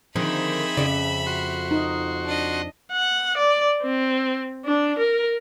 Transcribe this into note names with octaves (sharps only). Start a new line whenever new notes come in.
D3 D#3 F3 C4 D#4 G#4 E5 B5
F2 C#3 D5
F#4 C6
D#4
D4 D#5
F#5
D5
C4
D4
A#4